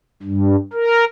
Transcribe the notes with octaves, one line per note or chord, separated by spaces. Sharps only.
G2
A#4